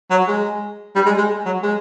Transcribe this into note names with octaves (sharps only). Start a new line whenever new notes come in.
F#3
G#3
G3
G#3
G#3
F#3
G#3